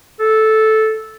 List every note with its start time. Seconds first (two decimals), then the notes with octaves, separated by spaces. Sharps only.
0.20 A4